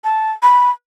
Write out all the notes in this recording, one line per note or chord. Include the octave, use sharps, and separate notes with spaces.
A5
B5